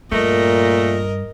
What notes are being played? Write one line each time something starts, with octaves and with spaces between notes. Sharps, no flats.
G2 A#2 A3 A#4 D#5